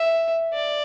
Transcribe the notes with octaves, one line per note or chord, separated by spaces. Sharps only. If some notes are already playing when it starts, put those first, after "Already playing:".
Already playing: E5
D5